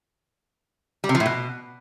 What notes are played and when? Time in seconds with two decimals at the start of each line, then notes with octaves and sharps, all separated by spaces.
1.04 G3
1.09 C3
1.15 F3
1.20 A2
1.26 B2